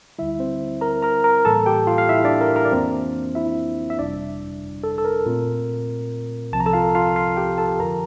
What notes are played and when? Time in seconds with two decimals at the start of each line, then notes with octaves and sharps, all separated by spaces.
0.18 D2 D3 G3 E4 E5
0.39 C4 C5
0.81 A#4 A#5
1.02 A#4 A#5
1.24 A#4 A#5
1.45 A2 E3 G3 A#3 A4 A5
1.66 G4 G5
1.87 F4 F5
1.98 F5
2.09 E4 E5
2.24 D4 D5
2.41 A#4
2.56 A#4
2.65 D5
2.72 F2 E3 A#3 C4 D4 F4 C5
3.35 E4 E5
3.90 E5
3.99 G1 F2 C3 G3 D4 D5
4.84 A4
4.98 A4
5.05 A#4
5.26 A#2 A3 C4 F4
6.52 C2 C3 F3 C4 A5
6.60 A#5
6.66 A4 A5
6.73 F4 F5
6.95 F4 F5
7.16 F4 F5
7.37 G4 G5
7.58 A4 A5
7.79 F2 D3 F3 A#4 A#5